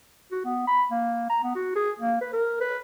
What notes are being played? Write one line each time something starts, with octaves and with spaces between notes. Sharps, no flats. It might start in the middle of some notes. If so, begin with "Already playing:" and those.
F#4
B3
B5
A#3
A#5
B3
F#4
G#4
A#3
B4
A#4
B4